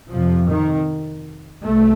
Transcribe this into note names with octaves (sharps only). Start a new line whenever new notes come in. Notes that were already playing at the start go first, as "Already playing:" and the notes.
F2 C3 F3
D#3
C2 A3